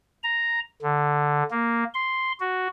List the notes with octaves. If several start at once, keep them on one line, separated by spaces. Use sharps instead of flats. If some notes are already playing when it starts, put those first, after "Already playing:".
A#5
D3
A#3
C6
F#4